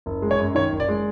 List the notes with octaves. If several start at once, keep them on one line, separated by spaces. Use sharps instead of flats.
F#1
G#3
C#5
F#2
D#3 C#5
F#1
D5
G#3